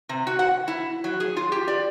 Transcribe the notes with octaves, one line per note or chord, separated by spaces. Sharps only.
C3
F#4
F#5
E4
F#3
G#4
F4
G4
D5